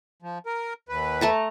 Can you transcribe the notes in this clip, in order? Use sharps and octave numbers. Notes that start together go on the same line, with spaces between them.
F3
A#4
D#2 B4
A3 A5 A#5